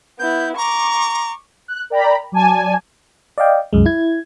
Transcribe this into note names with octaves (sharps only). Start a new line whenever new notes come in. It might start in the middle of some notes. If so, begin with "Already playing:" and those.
B3 E4 G6
A#5 C#6 D6
F#6
A#4 D5 G5 A#5 B5
F#3 D5 G#5 A5
D5 D#5 F5 G5
C2 F#2 G#3
E4 G#6